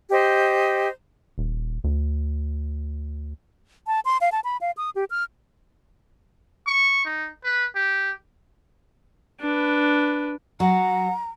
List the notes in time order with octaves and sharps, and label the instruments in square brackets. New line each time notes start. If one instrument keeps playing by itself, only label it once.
[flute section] G4 C5 D#5
[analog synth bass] D#1
D2
[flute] A5
C6
F5
A5
B5
F5
D#6
G4
F6
[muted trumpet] C#6
D#4
B4
G4
[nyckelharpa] D4 B4
[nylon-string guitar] F#3 [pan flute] F#5 [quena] A#5